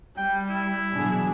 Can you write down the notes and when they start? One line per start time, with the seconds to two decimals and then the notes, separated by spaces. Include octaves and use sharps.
0.18 G3 G5
0.50 E4
0.94 B2 E3 F#3 D4 G#4